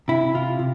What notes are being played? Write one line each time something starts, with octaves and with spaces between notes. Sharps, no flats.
C3 E4
C3 F4
C3